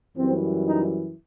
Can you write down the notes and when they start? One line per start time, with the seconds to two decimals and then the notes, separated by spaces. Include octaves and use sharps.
0.16 F#2 E3 G3 C4
0.65 D#4